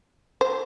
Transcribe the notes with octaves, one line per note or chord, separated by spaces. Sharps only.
C5